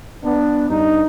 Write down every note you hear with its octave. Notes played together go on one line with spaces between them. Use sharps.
B3 D4
G2 D#4